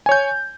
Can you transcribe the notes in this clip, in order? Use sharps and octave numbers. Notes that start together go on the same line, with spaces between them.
C#5 G#5 G6